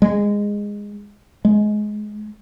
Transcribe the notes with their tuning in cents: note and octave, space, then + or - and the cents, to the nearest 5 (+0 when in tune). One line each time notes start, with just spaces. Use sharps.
G#3 -15
G#3 +20